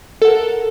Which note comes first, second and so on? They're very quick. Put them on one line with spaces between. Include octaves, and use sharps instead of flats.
A4 F#5 A#4